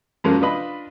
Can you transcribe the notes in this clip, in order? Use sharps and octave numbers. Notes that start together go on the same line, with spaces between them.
F#2 F3 F#3 G#3 A#3 C#4
D4 F4 B4 D#5 B5